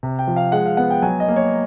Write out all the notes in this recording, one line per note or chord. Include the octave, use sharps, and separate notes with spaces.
C3
G5
F3
F5
G#3 F#5
F5
B3 F#5
G5
F#3 G#5
D#5
A#3
C#5